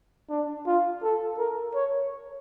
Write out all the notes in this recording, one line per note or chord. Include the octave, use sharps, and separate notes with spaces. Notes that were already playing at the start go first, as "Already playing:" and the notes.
D4
F4
A4
A#4
C#5